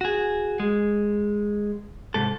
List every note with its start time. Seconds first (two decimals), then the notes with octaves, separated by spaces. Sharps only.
0.01 F#4 G#4
0.60 G#3
2.14 C2 G#2 A4